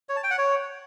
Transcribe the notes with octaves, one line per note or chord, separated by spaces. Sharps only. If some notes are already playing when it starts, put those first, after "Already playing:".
C#5
A5
G5
F#5
C#5